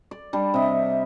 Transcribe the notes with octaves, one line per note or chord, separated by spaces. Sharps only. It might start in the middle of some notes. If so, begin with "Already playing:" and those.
D5
G3 D4
C3 D#5 E5